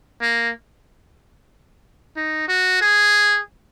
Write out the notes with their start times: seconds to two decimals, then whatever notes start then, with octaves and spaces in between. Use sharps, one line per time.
0.21 A#3
2.17 D#4
2.48 F#4
2.81 G#4